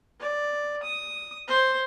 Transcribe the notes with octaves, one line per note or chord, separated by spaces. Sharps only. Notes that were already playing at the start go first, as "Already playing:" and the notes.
D5
D#6
C5